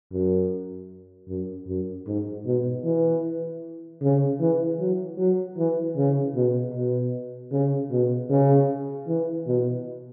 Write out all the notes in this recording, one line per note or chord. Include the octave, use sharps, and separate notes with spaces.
F#2
F#2
F#2
G#2
B2
E3
C#3
E3
F#3
F#3
E3
C#3
B2
B2
C#3
B2
C#3
E3
B2